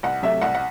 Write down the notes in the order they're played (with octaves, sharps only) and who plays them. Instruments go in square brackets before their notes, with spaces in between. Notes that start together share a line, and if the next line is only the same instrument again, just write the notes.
[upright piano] C2 F#5
C3 F#3 A3 E5
C2 F#5
F#5